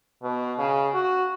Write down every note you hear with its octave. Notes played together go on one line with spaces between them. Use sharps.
B2
C#3
F#4